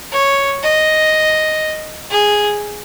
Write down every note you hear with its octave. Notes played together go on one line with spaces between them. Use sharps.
C#5
D#5
G#4